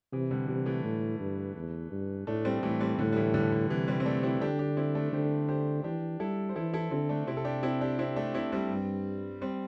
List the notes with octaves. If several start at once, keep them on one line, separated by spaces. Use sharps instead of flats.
C3 E3
D3 G3
C3 E3
E3 A3
A2
G2
E2
G2
A2 A3 D4
G3 C4
A2 E3 A3
G3 C4
A2 D3 G3
G3
E3 A3
D3 G3
D3
C3 E3
G3 C4
C4
A3 D4
C4 E4
D3 D4 G4
D4 G4
C4 E4
A3 D4
D3 G4 C5
G4 C5
E3 D4 G4
G3 E4 A4
C5
E3 E4 A4
E4 A4
D3 C4 E4
A3 D4
C3 C4 E4
A4
D4 G4
C4 E4
D4 G4
C4 E4
A3 D4
C4 E4
G3 C4
G2
G3 C4